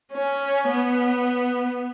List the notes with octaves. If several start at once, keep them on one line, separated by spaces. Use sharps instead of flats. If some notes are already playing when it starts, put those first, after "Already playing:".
C#4
B3